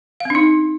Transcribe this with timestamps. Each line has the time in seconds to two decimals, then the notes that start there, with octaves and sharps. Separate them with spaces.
0.20 F5
0.25 C4
0.30 D4
0.35 D#4